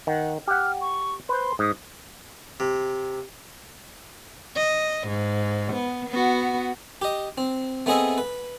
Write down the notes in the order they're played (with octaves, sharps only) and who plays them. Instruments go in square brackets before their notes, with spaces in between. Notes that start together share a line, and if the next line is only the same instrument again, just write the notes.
[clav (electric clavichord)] D#3 [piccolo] F#5
[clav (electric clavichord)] G4 F#5 [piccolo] F6
[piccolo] C#6
[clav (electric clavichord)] B4 C5 [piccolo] C6
[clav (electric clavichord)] G#2 [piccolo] D#6
[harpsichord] C3
[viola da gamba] D#5
G#2
B3
B3 F#4
[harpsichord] G4 D#5
C4
A3 B3 C4 G#4 D#5 E5
B4